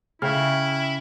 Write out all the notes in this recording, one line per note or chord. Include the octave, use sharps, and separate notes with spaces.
C#3 E4 C#5 E5 G5 F6